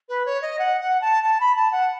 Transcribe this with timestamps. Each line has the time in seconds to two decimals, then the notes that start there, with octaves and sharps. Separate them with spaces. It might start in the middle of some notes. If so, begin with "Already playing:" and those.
0.09 B4
0.26 C#5
0.42 D#5
0.59 F#5
0.81 F#5
1.01 A5
1.24 A5
1.40 B5
1.56 A5
1.72 F#5